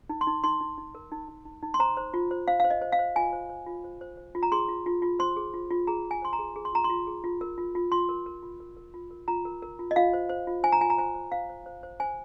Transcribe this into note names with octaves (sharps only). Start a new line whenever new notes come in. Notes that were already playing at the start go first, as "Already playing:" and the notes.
D#4
C6
D#4
D#4 C6
D#4
D#4
A#4
D#4
D#4
D#4
D#4
C6
C5 A#5
C5
F4
C5
C5 F5
C5 F5
D#5
C5
F5
C5
F4 G#5
C5
C5
F4
C5
C5
C5
F4
A#5
G#4 C6
F4
F4
F4
C5 C6
G#4
F4
F4
G#4 A#5
G#4
G#5
C5 C6
A#5
G#4
G#4
C6
F4 A#5
C6
F4
G#4
F4
A#4
F4
F4
F4 C6
A#4
A#4
F4
A#4
A#4
F4
A#4
F4 A#5
A#4
A#4
F4
D#5
F4 F5
C5
C5
F4
C5 G#5
A#5
F4 G#5
A#5
C5 G#5
C5
C5 F5
C5
C5
C5
C5 G#5